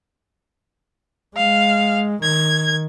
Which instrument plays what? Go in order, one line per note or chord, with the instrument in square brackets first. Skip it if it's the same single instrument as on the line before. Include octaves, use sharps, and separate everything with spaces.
[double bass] G#3 [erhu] F5
[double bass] D#3 [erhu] G#6